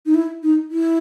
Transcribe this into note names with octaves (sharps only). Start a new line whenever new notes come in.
D#4
E4
D#4
E4